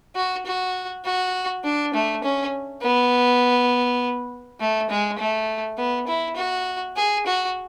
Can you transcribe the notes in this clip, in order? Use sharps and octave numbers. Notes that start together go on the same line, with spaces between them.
F#4
F#4
F#4
D4
A3
C#4
B3
A3
G#3
A3
B3
E4
F#4
G#4
F#4